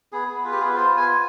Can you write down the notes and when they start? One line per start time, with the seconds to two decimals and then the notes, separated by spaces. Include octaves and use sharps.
0.12 B3 G#4
0.28 B3
0.44 F4 B4
0.52 G4
0.60 B3 G#4
0.68 B4
0.75 F4 C5
0.92 B3
0.97 G#5
1.07 F4